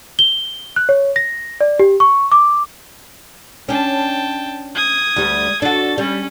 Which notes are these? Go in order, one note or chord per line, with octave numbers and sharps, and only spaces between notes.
G7
F#6
C#5
A#6
D5
G4
C#6
D6
C#4 D4 G5 A5
D#6 G#6
D2 G3
D4 F#4 A4 A6
G3 C#4